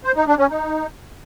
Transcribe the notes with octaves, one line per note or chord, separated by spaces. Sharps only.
C5
D#4
D4
C#4
D#4